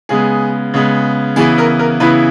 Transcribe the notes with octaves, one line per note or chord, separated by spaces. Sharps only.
C#3 G#3 B3 G#4
C#3 G#3 B3
C#3 E3 B3 E4 G#4
A#4
A#4
C#3 E3 B3 E4 B4